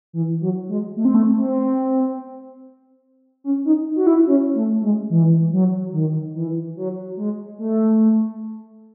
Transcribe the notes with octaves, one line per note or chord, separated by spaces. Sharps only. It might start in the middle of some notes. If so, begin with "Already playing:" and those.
E3
F#3
G#3
A3
C4
A3
C4
C#4
D#4
F#4
E4
C#4
A3
G#3
E3
F#3
D#3
E3
F#3
G#3
A3